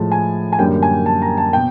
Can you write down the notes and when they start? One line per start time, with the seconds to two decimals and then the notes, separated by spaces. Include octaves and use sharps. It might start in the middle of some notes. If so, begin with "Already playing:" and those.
Already playing: A2 F3 G#3 A5
0.12 G#5
0.53 G#5
0.58 F#2 D3 G3 A#3 G5
0.83 G#5
1.06 A5
1.22 A#5
1.38 A5
1.53 B2 G5